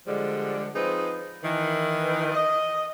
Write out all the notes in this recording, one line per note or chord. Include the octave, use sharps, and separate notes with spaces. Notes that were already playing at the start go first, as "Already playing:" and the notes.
D3 F3 G3 G#3
F3 C4 D#4 G#4 B4
D#3 E3
D#5